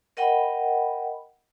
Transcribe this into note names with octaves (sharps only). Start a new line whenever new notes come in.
A#4 D#5 F#5 G5 B5